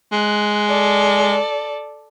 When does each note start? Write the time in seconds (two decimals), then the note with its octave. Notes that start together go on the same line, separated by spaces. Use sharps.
0.12 G#3 F#6
0.68 A4 D5